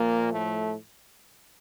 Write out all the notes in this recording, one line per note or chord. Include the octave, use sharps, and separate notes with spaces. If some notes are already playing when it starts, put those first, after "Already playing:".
Already playing: A#2 F3 A#3
A2 A3